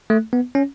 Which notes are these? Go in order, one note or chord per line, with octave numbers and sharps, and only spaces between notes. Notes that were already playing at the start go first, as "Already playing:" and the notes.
A3
B3
C#4